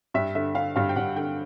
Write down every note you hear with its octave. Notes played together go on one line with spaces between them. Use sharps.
G2 E5
D3 E5
D3 F5
G2 F5
G5
G2 F#5
D3 G5